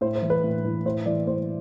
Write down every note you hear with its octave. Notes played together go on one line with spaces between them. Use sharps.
A2 C5
C5
E3
B4
A2
E3
A2 C5
E3 D5
A2 C5